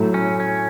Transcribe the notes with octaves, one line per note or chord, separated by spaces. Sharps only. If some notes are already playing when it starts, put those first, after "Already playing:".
Already playing: A2 F#3 A3
C#4
C#4